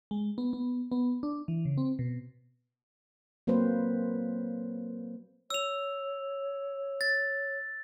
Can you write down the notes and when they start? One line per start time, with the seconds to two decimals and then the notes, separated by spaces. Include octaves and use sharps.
0.11 G#3
0.38 B3
0.53 B3
0.92 B3
1.23 D4
1.48 E3
1.65 C#3
1.78 C4
1.99 B2
3.47 F#3 A#3 C4 B4 C5
5.50 C#5 E6 F7
7.01 A6